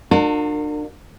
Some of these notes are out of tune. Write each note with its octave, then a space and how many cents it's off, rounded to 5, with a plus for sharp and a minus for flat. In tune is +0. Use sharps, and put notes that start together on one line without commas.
D4 +35 F#4 -45 A#4 -40